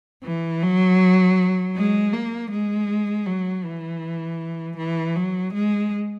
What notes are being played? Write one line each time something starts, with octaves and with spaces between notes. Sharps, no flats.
E3
F#3
G#3
A#3
G#3
F#3
E3
E3
F#3
G#3